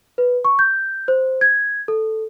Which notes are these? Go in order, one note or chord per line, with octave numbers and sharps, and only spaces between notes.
B4
C#6
G6
C5
G#6
A4